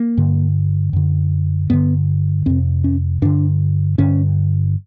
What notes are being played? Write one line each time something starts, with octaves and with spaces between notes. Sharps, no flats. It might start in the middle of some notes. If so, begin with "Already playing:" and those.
Already playing: A#3
G2 D3
F#2 D3
G2 D3 B3
F2 C3 C4
C#4
G2 D3 D4
G2 D3 C#4